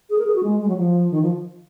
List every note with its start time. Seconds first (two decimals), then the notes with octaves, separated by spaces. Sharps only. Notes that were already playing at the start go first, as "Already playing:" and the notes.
0.10 G#4
0.18 A#4
0.27 G#4
0.35 F#4
0.43 G#3
0.60 G#3
0.68 F#3
0.77 F3
1.11 D#3
1.22 F3